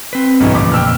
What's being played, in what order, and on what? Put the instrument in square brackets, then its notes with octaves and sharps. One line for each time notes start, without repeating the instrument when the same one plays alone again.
[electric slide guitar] C4 B4
[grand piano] B1 G2 E3
[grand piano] A1 D6 [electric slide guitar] F2 A#2 C#3
[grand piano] G5 E6 F6